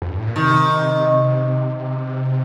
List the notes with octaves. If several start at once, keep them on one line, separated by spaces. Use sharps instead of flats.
F2
G2
A2
A#2
C3 D#3